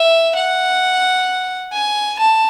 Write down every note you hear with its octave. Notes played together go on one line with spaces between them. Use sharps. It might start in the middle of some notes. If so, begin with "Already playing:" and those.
Already playing: E5
F#5
G#5
A5